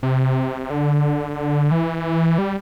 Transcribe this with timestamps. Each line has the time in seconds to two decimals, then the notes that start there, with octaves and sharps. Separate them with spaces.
0.03 C3
0.70 D3
1.71 E3
2.38 G3